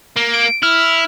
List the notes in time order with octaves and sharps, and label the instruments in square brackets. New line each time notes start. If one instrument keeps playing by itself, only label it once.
[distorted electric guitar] A#3
[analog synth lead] D7
[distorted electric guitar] E4 [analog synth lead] F6